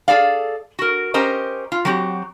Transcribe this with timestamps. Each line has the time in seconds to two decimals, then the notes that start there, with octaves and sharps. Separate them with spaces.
0.08 G#4 A4 D5 F5
0.79 F#4 A#4
1.14 C#4 G4 A#4 C5 D#5
1.72 F4
1.85 F#3 C4 F#4 G4